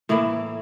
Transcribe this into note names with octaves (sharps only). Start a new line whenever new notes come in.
A2 E3 A#3 E4